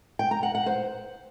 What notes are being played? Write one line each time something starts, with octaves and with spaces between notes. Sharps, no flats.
G5
A#5
F#5
F#5
C5